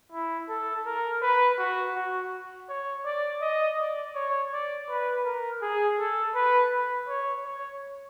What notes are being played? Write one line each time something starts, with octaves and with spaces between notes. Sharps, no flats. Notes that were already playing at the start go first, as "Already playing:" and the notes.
E4
A4
A#4
B4
F#4
F#4
C#5
D5
D#5
D5
C#5
D5
B4
A#4
G#4
A4
B4
B4
C#5
C#5